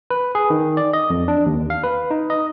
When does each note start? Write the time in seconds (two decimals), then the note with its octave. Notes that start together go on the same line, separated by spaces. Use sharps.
0.10 B4
0.35 G#4
0.50 D#3
0.77 D5
0.93 D#5
1.10 F2
1.28 D4
1.46 D#2
1.70 F5
1.83 B4
2.11 D#4
2.30 D#5